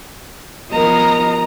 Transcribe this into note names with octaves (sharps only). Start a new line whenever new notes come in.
F3 B3 A#4 D#5 A#5